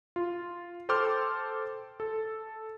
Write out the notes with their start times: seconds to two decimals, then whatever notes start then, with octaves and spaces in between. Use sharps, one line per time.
0.16 F4
0.89 A4 C5 G5 C6 D6 F6
2.00 A4